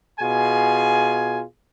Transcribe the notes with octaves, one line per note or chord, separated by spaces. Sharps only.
B2 F4 G#4 G#5